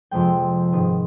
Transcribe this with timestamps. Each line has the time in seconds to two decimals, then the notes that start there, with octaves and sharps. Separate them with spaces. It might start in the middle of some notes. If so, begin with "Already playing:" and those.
0.11 F2 C3 F3 G#3 G5
0.72 G#2 D#3 B3